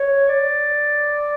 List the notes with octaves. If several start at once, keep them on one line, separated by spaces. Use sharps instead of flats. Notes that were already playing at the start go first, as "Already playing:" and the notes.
Already playing: C#5
D5